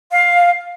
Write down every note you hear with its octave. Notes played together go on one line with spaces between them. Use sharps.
F5